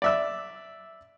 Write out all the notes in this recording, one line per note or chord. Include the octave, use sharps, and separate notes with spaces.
D5 E5 E6